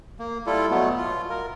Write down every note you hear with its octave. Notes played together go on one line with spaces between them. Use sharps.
A#3
G3 E4 F4 A4
B2 F#3 A3 B3
F4
A#4